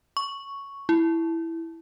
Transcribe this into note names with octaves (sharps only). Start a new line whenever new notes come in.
C#6
E4